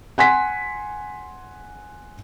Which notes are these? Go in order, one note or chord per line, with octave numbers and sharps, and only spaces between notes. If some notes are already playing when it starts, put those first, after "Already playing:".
F#5 G#5 C6 B6